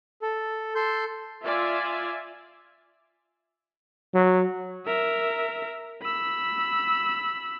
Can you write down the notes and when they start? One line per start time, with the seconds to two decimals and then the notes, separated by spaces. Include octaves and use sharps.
0.22 A4
0.75 A4 C6 G6
1.44 F4 D5 E5 G#5
4.14 F#3
4.86 A#4 E5
6.03 B5 E6